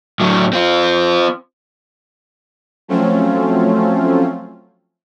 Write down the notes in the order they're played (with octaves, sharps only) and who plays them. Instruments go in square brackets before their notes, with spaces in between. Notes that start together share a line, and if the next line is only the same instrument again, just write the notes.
[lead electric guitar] A2 F#3
C4 F4
[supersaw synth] F3 F#3 A3 C4 C#4 F4